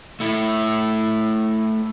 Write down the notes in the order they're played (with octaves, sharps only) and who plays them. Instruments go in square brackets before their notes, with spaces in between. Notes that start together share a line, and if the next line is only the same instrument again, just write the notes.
[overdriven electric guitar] A3 E4